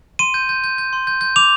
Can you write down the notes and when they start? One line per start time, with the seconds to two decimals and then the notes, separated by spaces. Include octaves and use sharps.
0.19 C6 D#7
0.34 G6
0.49 G6
0.64 G6
0.78 G6
0.93 C6
1.07 G6
1.21 G6
1.36 D6 F7